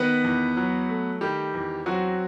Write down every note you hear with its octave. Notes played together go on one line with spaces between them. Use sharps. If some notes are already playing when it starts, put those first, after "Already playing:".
Already playing: D#3 B3 B4
E2
F#3
A3
D#3 G3 G4
E2
F#3 C4 F#4